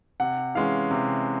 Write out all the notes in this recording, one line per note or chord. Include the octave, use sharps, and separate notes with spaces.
C3 F#5
E3 G#3 C#4 F5
C3